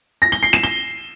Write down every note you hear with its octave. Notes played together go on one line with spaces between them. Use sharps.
A#6
G7
C7
E7
G7